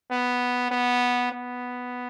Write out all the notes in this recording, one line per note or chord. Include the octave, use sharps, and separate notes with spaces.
B3
B3
B3